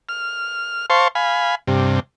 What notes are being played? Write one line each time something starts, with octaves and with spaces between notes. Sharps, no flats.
F6
C5 F5 A5 C6 C#6
F5 G#5 B5
G2 C3